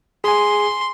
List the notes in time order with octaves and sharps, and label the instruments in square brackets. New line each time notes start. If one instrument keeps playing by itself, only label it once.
[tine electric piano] G#4 G#5 [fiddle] C6